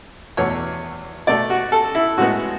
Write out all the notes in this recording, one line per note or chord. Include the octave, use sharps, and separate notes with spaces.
E2 B2 A3 C#5
B2 A3 D5
F#4
A4
E4
A2 G#3 B3 F#4